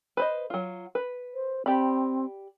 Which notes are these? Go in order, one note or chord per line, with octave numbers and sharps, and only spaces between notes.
B4 C5 D#5
F#3 F4
B4
C5
C4 G4 D5 B5